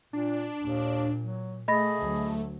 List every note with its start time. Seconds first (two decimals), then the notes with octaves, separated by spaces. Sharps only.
0.13 A#2 D4
0.61 D#2 A#2
1.20 F#3
1.68 A3 G#4 D#5 B5 A#6
1.98 D2 F#3